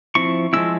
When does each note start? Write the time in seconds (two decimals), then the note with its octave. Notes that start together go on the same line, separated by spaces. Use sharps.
0.15 F3 C4 E4 C#6
0.53 F3 G#3 C#4 E4 E6